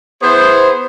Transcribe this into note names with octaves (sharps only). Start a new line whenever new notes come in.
B3 E4 G#4 C5